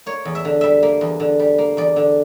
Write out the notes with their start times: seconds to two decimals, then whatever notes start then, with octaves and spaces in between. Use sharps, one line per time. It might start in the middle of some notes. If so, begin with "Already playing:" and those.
0.06 A#3 C#5
0.25 E2
0.35 E5
0.45 D3
0.61 G3 E5
0.83 A#3
1.01 E2
1.20 D3
1.39 G3
1.58 A#3
1.77 E2 D5
1.96 D3